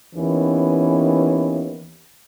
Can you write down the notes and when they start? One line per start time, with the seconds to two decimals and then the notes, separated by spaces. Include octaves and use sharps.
0.15 D#2 E3 B3 C#4